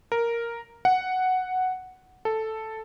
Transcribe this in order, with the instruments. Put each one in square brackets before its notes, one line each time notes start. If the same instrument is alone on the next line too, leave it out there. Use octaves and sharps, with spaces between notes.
[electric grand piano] A#4
F#5
A4